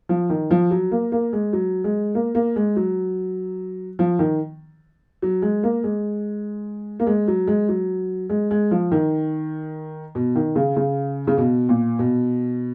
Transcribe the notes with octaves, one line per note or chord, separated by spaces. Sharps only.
F3
D#3
F3
F#3
A#3
A#3
G#3
F#3
G#3
A#3
A#3
G#3
F#3
F3
D#3
F#3
G#3
A#3
G#3
A#3
G#3
F#3
G#3
F#3
G#3
G#3
F3
D#3
B2
D#3
C#3
C#3
C#3
B2
A#2
B2